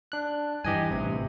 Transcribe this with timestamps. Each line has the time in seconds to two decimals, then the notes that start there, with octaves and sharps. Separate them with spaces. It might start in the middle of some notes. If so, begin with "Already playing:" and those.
0.12 D4 F#6
0.64 G2 E3 G4 D#5 G#5
0.91 A1 G2 C3